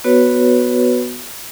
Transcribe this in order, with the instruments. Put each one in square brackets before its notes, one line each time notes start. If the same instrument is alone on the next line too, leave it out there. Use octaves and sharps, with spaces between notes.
[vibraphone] B3 F#4 B4 C#5